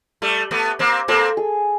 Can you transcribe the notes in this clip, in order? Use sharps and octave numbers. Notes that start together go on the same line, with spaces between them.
G3 A3
A3 B3
A#3 C4
A#3 C4 A4
G#4